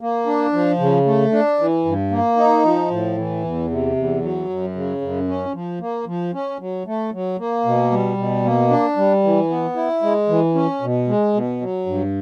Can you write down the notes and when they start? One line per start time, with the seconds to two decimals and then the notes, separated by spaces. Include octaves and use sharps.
0.01 A#3
0.26 D4
0.53 F3
0.79 C#3
1.06 A3
1.32 D4
1.59 E3
1.85 G2
2.11 A#3
2.37 D#4
2.64 F3
2.90 A2
3.17 E3
3.44 E2
3.70 C3
3.96 E2
4.22 F#3
4.49 F#2
4.75 C#3
5.01 F#2
5.28 C#4
5.54 F3
5.80 A#3
6.06 F3
6.34 C#4
6.59 F#3
6.87 A3
7.13 F#3
7.39 A#3
7.65 B2
7.91 G3
8.17 B2
8.44 A#3
8.70 D4
8.97 G3
9.24 E3
9.50 B3
9.76 E4
10.02 G#3
10.29 E3
10.55 C#4
10.81 B2
11.08 G#3
11.34 B2
11.61 F#3
11.86 G2